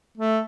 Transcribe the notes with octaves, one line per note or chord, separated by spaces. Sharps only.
A3